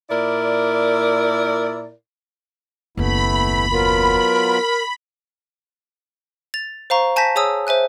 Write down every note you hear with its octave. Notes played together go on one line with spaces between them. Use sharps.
A#2 E4 A#4 D5
F#1 D#2 A3 B3 E4 B5
F#3 B3 F4 A#4
A6 F7
C5 F5 A#5 C#6
G#5 A5 G6 A#6 B6
G#4 C#5 G#5 D#6 E6
C5 E5 G#5 F#6